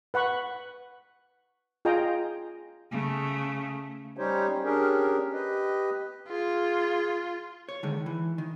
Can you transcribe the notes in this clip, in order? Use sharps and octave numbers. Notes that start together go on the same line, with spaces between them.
B4 F#5 B5 C#6
F4 G#4 D#5 G5 A#5
C#3 A3
G3 C#4 D#4 G4 C5 C#5
C#4 D4 G4 G#4 A#4
G4 B4 D#5
F4 G#4
C#5
D3 D#3 G#3
E3
D#3